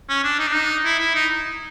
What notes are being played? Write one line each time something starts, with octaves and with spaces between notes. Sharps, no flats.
C#4
D4
D#4
D4
D#4
E4
E4
D#4